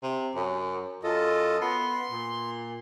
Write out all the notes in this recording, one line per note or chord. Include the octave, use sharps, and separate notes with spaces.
C3
F#2
F#2 F4 A4 D#5
B3 C6
A#2